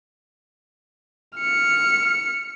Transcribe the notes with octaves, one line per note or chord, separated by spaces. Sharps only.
F6 C#7